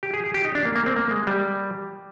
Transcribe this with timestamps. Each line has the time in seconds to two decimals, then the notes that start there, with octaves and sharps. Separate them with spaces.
0.03 G4
0.14 G#4
0.24 G#4
0.34 G4
0.44 D#4
0.55 D4
0.65 A#3
0.75 A#3
0.86 C4
0.96 A#3
1.11 G#3
1.27 G3